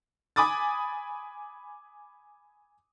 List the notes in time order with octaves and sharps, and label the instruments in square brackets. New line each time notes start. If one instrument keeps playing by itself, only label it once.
[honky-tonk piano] G#5 B5 D6 D#6 A6